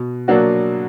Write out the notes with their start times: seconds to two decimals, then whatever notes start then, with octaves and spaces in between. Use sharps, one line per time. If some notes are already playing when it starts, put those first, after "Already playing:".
Already playing: B2
0.28 F#3 A#3 D4 F#4